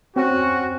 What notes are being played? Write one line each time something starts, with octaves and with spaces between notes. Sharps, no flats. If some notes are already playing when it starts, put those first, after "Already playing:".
C4 C#4 F#4